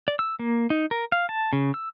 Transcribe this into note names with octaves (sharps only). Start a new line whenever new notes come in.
D5
E6
A#3
D#4
A#4
F5
A5
C#3
E6